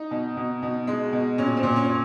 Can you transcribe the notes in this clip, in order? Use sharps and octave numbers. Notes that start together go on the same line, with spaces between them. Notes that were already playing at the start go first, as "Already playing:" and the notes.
Already playing: D#4
B2
B2
B2
G#3
B2
A#2 C#4
C4
A#2
C#4
A#2